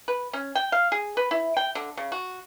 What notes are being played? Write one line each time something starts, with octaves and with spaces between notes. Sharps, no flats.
B4
C#4
G5
F5
G#4
B4
E4
G5
D3
C#3
F#4